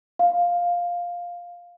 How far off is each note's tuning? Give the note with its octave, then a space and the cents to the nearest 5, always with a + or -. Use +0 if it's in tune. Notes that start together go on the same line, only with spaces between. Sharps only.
F5 +5